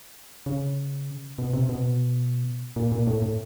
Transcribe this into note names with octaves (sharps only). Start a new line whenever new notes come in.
C#3
B2
C3
B2
A#2
A#2
A2
A2